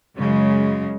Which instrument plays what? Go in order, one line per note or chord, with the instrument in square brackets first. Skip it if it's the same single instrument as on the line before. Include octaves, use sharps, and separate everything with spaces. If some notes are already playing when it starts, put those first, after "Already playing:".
[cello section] F#2 C#3 G#3